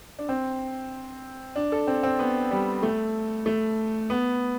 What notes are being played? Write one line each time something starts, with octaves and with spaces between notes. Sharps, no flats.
D4
C4
D4
A4
C4
C4
B3
G3
A3
A3
B3